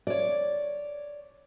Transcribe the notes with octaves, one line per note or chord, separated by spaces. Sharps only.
C#5 D5